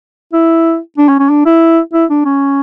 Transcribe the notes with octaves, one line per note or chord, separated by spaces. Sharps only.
E4
D4
C#4
C#4
D4
E4
E4
D4
C#4